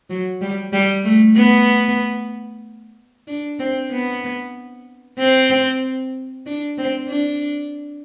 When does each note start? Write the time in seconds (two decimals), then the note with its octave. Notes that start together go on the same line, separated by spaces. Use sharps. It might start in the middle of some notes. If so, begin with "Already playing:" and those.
0.10 F#3
0.41 G3
0.73 G3
1.05 A3
1.36 B3
3.28 D4
3.59 C4
3.91 B3
5.18 C4
6.46 D4
6.78 C4
7.09 D4